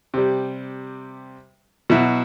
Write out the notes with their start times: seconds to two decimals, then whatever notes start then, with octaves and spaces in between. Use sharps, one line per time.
0.14 C3 G3
1.90 B2 F#3 E4 F#4